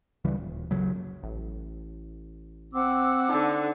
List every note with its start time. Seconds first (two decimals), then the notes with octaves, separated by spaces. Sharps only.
0.24 D2 C#3 E3 G3
0.37 D#1
0.71 F#1 C#2 C#3 F#3
1.23 A1
2.74 C4 F#5 D6 E6
3.29 D3 D#4